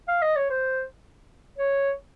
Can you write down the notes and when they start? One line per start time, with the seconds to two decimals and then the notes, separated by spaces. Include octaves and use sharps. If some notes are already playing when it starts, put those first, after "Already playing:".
0.08 F5
0.22 D#5
0.36 C#5
0.50 C5
1.58 C#5